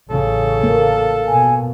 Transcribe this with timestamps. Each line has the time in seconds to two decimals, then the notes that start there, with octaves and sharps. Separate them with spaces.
0.10 A1 C#3 A4
0.63 A#3
1.28 B2 G#5